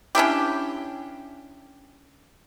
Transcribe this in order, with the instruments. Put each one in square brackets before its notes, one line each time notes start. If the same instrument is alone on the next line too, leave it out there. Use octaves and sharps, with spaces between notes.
[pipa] C#4 D4 E4 G4